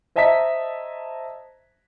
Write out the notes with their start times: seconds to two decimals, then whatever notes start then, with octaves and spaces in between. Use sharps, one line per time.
0.16 C5 D#5 E5 A5 A#5 B6